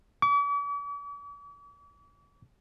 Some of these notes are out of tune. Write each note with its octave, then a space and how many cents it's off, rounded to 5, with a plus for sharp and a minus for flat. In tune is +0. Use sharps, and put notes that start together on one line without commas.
D6 -45